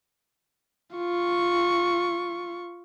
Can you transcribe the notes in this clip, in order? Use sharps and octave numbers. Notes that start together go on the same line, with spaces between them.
F4 C#6